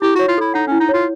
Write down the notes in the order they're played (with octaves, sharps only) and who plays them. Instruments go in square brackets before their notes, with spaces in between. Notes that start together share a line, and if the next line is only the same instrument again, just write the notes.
[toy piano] E4 [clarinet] G4
[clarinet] F#4 [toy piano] C#5
[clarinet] F4
[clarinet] E4 [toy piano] A4
[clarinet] D#4 [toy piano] F#5
[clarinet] C#4 [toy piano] E4
[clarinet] D#4
[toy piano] C#5
[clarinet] F4